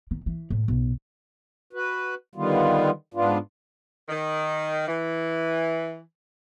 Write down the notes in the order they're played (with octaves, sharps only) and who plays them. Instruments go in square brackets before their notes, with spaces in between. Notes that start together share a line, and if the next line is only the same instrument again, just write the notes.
[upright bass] D#3
E3
A2
B1
[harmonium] F#4 B4
D3 D#3 G3 B3 F4
G#2 B3 D4 F4
[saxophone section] D#3
E3